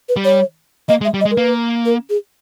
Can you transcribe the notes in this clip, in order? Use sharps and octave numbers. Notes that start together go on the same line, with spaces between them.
B4
G3
C#5
A#3 D#5
G#3
E5
G3
D#5
G#3
A#4
A#3 B4
A#4
G#4